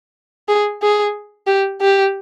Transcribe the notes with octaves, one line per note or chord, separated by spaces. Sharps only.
G#4
G#4
G4
G4